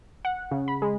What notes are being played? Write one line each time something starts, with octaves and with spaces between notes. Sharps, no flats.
F#5
C#3
B5
G#3